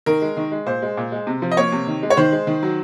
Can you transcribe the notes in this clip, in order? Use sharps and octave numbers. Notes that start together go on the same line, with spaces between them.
D#3 A#4
G#3
D#3
G#3
A#2 C5
G#3
A#2
G#3
C3
F3
D#5
A#3 C#5
C3
D#3
G#3
C#5
D#3 C5
G#3
D#3
F#3